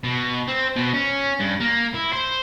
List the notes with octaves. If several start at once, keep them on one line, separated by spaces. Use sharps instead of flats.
B2
C4
B2
C#4
G2
A#3
E4
C5